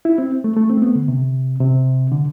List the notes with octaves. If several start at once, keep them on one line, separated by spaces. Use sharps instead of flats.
E4
C4
A3
A3
C4
A3
B3
D3
C3
C3
D3